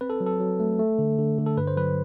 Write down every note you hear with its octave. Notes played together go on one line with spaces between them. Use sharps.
C4 B4
A4
F#3
A4
F#3
A3
A3
D3
D3
D3
A4
G2 B4
C5
F#3 B4